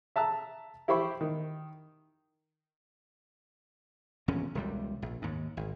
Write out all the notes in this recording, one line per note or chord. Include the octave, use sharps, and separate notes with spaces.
E5 A5 A#5 E6
E4 G4 C5 B5 C#6
D#3
D#1 E2 C#3 C#4
E1 C#2 G3
A#1
D#2 G#2
G#1